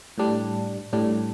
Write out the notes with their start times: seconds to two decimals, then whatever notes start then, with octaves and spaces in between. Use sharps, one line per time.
0.18 A2 G3 D4
0.93 A2 G3 D4